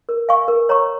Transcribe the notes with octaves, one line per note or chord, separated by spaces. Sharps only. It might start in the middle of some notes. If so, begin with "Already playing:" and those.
A#4
F5 G#5 C#6
A#4
C#5 A#5 C#6